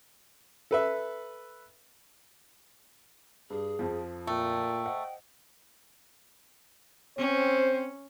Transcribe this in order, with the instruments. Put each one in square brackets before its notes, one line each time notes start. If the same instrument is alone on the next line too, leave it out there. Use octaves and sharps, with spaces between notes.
[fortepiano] A4 B4 E5
[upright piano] G2 [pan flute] G#4
[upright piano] F2 F3
[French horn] A#2 [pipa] A3 [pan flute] G5
[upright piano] C5 D#5 F#5
[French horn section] C4 C5 [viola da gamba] C#4